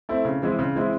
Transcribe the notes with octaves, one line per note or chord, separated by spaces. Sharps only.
A3 C4 E4
C#3
E3 G#3 C4 E4
C#3
E3 G#3 C4 E4